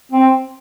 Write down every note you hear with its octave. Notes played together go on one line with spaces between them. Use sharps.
C4